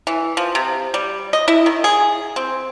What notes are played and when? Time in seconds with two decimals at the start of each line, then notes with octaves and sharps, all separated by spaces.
0.07 E3
0.37 F3
0.55 C3
0.94 G3
1.33 D#5
1.48 E4
1.66 D#3
1.84 G#4
2.36 C4